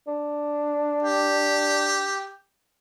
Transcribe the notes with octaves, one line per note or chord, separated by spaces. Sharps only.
D4
G4